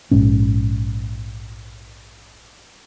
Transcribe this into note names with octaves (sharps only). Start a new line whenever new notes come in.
A#1 G#2 C#4